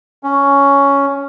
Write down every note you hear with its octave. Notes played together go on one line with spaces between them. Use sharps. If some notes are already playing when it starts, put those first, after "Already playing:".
C#4